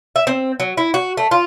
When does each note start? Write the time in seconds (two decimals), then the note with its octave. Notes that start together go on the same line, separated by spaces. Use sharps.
0.16 E5
0.27 C4
0.60 F#3
0.77 E4
0.94 F#4
1.17 A3
1.31 F4